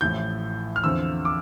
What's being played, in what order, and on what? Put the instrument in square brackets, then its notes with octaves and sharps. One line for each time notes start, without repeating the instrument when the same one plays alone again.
[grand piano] A1 A2 F3 G6
F6
E2 D3 F3 C4 E6
D6